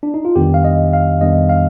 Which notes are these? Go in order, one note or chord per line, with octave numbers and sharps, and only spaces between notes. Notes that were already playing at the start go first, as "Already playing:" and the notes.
D4
D#4
F4
F2 D#3 G3 B3 D4 G4
F5
D#5
F5
F2 D#3 G3 B3 D4 D#5
F5